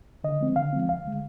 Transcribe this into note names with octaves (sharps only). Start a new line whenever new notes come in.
D3 D#5
F3 G#3 C4
D3 F5
F3 G#3 C4
D2 F5
D3 G#3